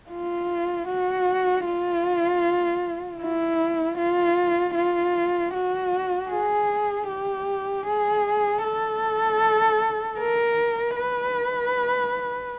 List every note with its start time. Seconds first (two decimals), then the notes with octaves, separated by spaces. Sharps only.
0.11 F4
0.88 F#4
1.65 F4
3.21 E4
3.98 F4
4.75 F4
5.54 F#4
6.30 G#4
7.08 G4
7.86 G#4
8.63 A4
10.19 A#4
10.96 B4